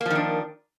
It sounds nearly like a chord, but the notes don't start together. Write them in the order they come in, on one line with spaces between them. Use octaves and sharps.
A#3 F3 D#3 D4